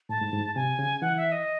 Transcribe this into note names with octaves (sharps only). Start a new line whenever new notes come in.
A2 A5
G#2
G#2
C3 G#5
C#3
E3 F#5
E5
D#5